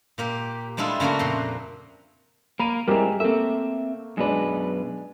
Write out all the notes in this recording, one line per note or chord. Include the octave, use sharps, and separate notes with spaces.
A#2 A#3 G4
G3 G#3 D4 E4 F4 A4
C#3 A3 A#3 D4 F#4
F2 A#2 C6
A#3 A#4 B5 D#7
G3 G#3 C4 E4 G4 A#4
A3 A#3 C4 E5
F#2 B2 G#3 D4 B4